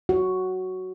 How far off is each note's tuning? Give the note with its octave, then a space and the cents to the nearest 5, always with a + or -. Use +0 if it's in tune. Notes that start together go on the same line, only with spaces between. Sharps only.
F#4 +5